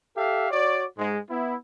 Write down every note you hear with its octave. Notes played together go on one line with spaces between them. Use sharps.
G4 A4 E5 F5
F#4 C#5 D5
G#2 G#3
B3 E4